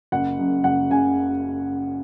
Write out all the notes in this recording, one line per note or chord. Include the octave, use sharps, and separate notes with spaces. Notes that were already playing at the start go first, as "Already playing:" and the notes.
F#1 F#5
F#2 C#3
F#1 F#5
C#3 G#5